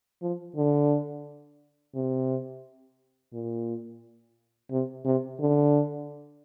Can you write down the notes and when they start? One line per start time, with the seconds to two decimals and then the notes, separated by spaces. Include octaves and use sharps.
0.22 F3
0.56 D3
1.95 C3
3.33 A#2
4.71 C3
5.05 C3
5.40 D3